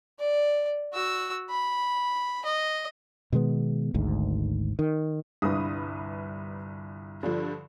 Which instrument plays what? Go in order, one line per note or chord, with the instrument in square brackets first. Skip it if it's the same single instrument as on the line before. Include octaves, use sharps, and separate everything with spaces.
[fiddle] D5
F#4 E6
B5
D#5
[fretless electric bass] B2 D#3 G#3 B3
G#1 D2 G#2
D#3
[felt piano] G1 C2 [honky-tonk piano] B4 D#6
[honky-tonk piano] G2 D3 F3